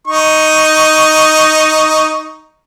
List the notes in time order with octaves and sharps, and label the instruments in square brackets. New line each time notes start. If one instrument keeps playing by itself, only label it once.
[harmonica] D#4 C#6